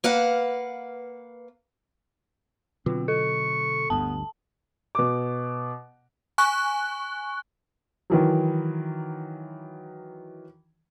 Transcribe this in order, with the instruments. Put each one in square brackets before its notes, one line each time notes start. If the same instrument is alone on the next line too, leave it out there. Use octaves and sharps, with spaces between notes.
[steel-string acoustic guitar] A#3 B4 F5 F#5
[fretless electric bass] B2 D3 F#3 [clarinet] C4 [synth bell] F4
[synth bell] A4 [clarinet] C#6
[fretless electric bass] G1 D2 G2 [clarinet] B3 [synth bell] A5
[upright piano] B2 D6
[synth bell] G#5 C#6 F#6
[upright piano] D#3 E3 F#3